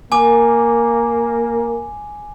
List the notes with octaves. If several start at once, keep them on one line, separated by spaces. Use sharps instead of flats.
A#3 G#5 D6